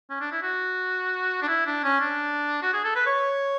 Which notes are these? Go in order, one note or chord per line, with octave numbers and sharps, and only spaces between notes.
C#4
D4
E4
F#4
D4
E4
D4
C#4
D4
F#4
G#4
A4
B4
C#5